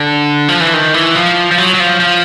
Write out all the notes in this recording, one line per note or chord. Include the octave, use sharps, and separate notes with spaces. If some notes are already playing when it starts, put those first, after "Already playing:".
Already playing: D3
F3
E3
D#3
E3
F3
F3
F#3
F#3
F3
F3